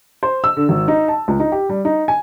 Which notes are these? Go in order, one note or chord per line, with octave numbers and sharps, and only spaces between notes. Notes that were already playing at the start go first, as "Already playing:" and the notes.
C5
E6
D3
G#1
D#4
A5
C#2
D#4
G4
G3
D#4
G#5